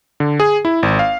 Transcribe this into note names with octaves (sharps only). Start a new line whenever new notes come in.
D3
G#4
E4
G#1
F5